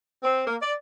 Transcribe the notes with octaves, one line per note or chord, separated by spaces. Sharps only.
C4
A#3
D5